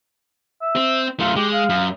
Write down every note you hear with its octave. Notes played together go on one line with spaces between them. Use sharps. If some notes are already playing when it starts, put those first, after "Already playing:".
E5
C4
F#2 A3 F4
G#3 G4
F5
F#2